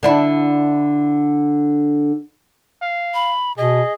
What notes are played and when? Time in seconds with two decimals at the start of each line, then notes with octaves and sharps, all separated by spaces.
0.03 D3 D4 E4
2.82 F5
3.14 B5
3.58 B2 G#4 D#5